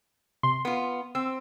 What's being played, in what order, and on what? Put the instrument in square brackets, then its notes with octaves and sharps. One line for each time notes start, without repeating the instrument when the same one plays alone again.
[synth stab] C3 C6
[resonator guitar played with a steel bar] B3 F4
[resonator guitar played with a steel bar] C4 [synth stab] E6